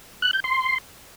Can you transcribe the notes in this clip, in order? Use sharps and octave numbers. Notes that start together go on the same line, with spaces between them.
F#6
G6
C6